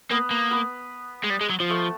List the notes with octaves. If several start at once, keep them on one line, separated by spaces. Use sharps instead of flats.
A#3 B3 B4
A#3
B3 B4
G#3
G3
G#3
F#3
F3
A3 A4